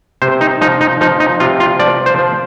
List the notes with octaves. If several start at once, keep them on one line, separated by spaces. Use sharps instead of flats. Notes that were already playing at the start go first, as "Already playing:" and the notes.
C3 C5
D#4
F3 D#4
D#4
F3 D#4
D#4
C3 F4
F4
F3 D5
C5
F3